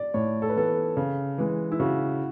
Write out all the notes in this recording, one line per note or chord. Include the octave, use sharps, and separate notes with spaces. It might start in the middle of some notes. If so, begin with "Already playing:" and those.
Already playing: D5
A2 C#5
A4
B4
E3 B3 A4
C#3
E3 G#3
E4
C#3 F#4